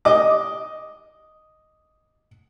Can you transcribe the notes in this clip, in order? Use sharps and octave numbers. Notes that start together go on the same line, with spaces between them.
D#5 D6